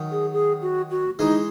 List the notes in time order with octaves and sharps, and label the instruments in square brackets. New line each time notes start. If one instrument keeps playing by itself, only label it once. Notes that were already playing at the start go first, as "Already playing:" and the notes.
Already playing: [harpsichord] D#3 F#3
[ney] G#4
G#4
F#4
F#4
[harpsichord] E3 G#3 [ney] D#4